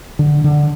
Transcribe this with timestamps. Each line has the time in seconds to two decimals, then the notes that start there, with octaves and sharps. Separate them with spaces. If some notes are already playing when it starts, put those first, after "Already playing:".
0.19 D3
0.44 D3